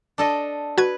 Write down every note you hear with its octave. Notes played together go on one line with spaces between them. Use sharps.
D4 A4 D#5
F#4 B4 G#6